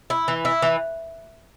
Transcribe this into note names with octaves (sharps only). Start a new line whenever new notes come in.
E4
E3
E4
E3